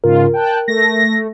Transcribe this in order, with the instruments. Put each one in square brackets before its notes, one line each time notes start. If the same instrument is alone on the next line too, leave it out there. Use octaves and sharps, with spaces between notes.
[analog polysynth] G#2 C#3 F4 [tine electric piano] A#4
[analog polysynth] G5 A5 F#6
[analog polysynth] A3 [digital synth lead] A#6